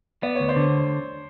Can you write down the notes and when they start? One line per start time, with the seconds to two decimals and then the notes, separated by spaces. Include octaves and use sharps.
0.23 B3 D5
0.35 D2 C#5
0.49 C5 D5
0.56 D3